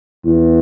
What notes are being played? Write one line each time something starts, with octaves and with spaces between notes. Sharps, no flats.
E2